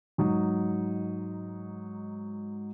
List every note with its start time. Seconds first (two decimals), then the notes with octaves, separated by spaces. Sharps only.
0.18 G#2 F#3 D#4